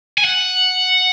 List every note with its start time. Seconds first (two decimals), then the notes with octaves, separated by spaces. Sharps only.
0.18 G#5
0.25 F#5